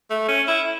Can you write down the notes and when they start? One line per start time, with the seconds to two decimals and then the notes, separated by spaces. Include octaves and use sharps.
0.10 A3
0.29 C#4
0.48 E4